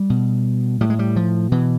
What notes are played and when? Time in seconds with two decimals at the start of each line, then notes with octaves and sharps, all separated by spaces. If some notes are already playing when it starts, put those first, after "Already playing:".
Already playing: G3
0.10 B2
0.81 A2 G3
0.90 G#3
0.99 G3
1.16 F3
1.52 B2 E3